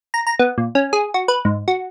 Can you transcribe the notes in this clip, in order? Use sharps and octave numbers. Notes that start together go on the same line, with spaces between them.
A#5
A#5
B3
A#2
C#4
G#4
F#4
B4
G#2
F#4